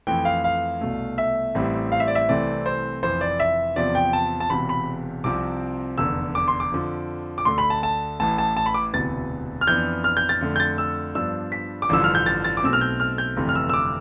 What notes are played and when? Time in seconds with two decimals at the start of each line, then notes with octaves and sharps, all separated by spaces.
0.07 F2 E3 A3 G5
0.25 F5
0.44 F5
0.81 C2 B2 A3
1.18 E5
1.55 A1 A2 G3 C4
1.92 F5
2.00 E5
2.08 D5
2.15 E5
2.29 C2 C3 E3 A3 C4 D5
2.66 C5
3.03 F1 F2 E3 C5
3.21 D5
3.40 E5
3.76 E2 C3 F3 D5
3.95 G5
4.13 A5
4.40 A5
4.50 E1 E2 C3 B5
4.69 B5
5.24 C2 C3 F3 C4 D6
5.98 F1 E2 D3 E6
6.35 D6
6.48 C6
6.60 D6
6.72 F2 D3 F3
7.38 D6
7.45 D2 D3 A3 C6
7.58 B5
7.70 A5
7.83 A5
8.20 A1 A2 E3 A5
8.38 A5
8.57 A5
8.66 B5
8.74 D6
8.94 E1 D2 C3 E3 B3 A6
9.61 F6
9.67 F2 E3 B3 D4 G6
10.04 F6
10.17 G6
10.29 A6
10.41 F2 D3 A3
10.56 G6
10.60 A6
10.78 E6
11.15 G2 F3 B3 D4 E6
11.52 B6
11.82 D6
11.89 A1 G2 D3 F3 E6
12.04 F6
12.15 G6
12.26 A6
12.44 A6
12.57 D6
12.63 B1 B2 A3 C4 E6
12.73 F6
12.81 G6
13.00 F6
13.18 G6
13.37 G1 F2 C3 E3 A3
13.49 F6
13.55 E6
13.69 E6
13.74 D6